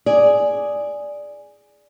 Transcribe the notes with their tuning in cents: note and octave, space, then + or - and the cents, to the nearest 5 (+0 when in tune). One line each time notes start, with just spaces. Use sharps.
G#4 +0 D5 +0